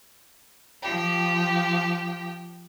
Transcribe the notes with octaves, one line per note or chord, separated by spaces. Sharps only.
F3 G4 G5